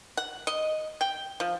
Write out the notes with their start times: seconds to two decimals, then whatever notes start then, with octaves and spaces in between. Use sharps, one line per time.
0.17 F#5
0.47 D#5
1.01 G5
1.40 F3